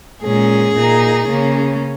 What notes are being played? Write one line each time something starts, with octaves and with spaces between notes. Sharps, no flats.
A#2 G#3 C#4 G#4
A#2 A#3 D#4
C#3 A#3 C#4